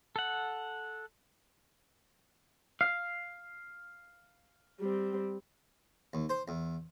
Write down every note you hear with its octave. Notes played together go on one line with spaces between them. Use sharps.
A4 F#5
F5
G3 C4
D#2
C5
E2